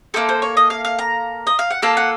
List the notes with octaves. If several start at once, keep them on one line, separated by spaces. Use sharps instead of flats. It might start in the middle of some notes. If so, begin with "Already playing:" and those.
A#3 D#4 A4 C5
C5
C#5
D#5
F5
F5
A#5
D#5
F5
F#5
A#3 F4 A4 A5
F#5